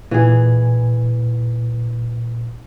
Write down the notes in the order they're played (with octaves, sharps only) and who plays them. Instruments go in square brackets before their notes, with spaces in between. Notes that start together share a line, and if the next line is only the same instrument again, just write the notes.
[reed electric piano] A#2 [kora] E3 G#4